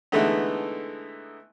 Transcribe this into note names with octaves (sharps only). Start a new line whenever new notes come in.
D3 E3 G#3 A3 B3 D#4